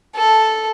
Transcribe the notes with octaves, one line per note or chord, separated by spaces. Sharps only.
A4